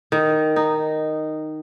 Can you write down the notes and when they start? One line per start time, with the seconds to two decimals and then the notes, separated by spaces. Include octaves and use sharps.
0.12 D#3
0.56 D#4